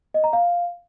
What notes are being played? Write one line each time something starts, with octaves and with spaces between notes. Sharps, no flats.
D#5
A#5
F5